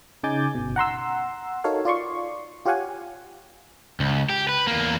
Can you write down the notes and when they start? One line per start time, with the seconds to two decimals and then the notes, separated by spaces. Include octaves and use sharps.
0.23 C#3 D#4 G#5 D6 G6 A6
0.55 G1 B2
0.76 F#5 A#5 C6 E6
1.64 D#4 F#4 A4 A#4 C#5 F5
1.85 F4 D5 C6 C#6
2.66 F4 G4 C#5 F5 F#5 G#5
4.00 C#2
4.30 G4
4.49 B4
4.67 E2 A#3